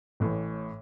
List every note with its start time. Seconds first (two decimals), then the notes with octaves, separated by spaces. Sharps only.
0.20 A1 A2 E3